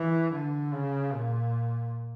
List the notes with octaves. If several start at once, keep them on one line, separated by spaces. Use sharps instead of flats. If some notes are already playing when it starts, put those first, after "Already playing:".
Already playing: E3
D3
C#3
A#2